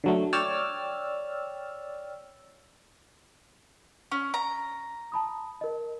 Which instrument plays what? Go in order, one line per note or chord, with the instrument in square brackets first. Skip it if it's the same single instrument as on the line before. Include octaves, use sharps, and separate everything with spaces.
[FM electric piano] D3 F#3 A3
C#5 D5 G5 E6 F6 A6
[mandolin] C#4 [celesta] C#6
[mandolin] A#5
[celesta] A5 B5 D#6
A#4 D#5